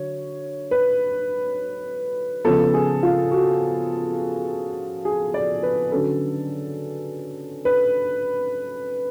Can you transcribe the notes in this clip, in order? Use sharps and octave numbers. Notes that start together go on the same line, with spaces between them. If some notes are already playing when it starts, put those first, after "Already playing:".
Already playing: D3 F#3 C#5
B4
C#3 F3 B3 A4
G#4
F4
F#4
G#4
D5
B4
D3 F#3 C#4 A4
B4